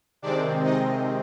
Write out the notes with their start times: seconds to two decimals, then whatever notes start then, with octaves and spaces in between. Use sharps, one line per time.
0.22 C3 D#3 G#3 C4 D4 D5
0.64 D#4 D#5